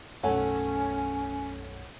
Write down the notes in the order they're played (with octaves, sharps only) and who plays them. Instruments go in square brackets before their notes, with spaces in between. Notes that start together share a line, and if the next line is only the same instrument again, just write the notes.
[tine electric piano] B1 F#2 [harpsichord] A3 A4 [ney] C#4 [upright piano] C#5 F#5 G#5